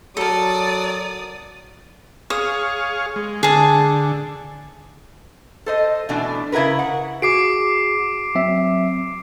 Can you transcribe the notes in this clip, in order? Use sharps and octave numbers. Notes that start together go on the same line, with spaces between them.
F#3 A4 A#4 D5 D#6
G#4 C#5 F5 D#6
G#3
D3 G#4 A5
A4 C5 D#5
B2 E3 A3 D4
C#3 E4 G4 A#4 B4
F#5
F#4 G#4 D6 C7 D7
F#3 C4 E5